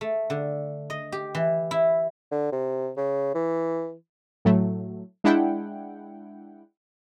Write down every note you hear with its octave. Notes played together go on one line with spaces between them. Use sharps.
A3
D3
D#5
G4
E3
E4
D3
C3
C#3
E3
A2 F#3 A3
G#3 D4 E4 F#5 G5